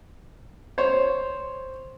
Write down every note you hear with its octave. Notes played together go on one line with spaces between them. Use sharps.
C5 C#5